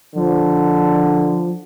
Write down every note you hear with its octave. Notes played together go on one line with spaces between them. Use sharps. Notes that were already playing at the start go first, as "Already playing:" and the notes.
D3 F3